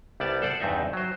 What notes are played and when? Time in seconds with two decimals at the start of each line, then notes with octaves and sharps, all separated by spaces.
0.20 C2 G3 B3 D5 A5
0.42 A4 C5 D5 F#5
0.60 E2 G2 C4 D#4 E5
0.93 F#3 C5